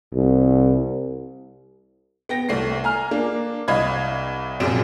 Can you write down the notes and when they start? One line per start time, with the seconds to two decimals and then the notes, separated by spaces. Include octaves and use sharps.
0.14 C2
2.29 B3 G5 A#6
2.49 C2 A3 C7
2.84 G#5 A#5 F6
3.11 A#3 D4
3.68 C2 D#5 F5 B5 G#6
4.60 A#1 F#2 C3 G#4 D7 E7